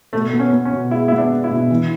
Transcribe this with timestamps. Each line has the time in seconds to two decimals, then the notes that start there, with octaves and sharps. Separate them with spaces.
0.13 B2 A3
0.33 B3
0.39 C#4
0.53 B3
0.65 C#4
0.73 B2
0.91 G#3 E4
1.08 B3 E4
1.18 D4
1.31 D4
1.44 E4
1.50 B2
1.71 E3